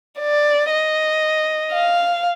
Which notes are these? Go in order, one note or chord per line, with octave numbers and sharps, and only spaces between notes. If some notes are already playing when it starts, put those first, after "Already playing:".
D5
D#5
F5